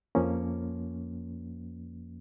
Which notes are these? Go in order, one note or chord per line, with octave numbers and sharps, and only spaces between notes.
F2 F3 A#3 C#4